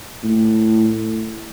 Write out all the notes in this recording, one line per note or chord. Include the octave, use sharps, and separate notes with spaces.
A2